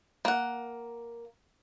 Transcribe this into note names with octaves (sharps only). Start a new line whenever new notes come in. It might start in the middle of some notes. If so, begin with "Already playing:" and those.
A#3 F#5